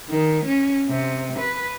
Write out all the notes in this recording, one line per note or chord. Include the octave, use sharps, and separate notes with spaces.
D#3
C#4
C3
B4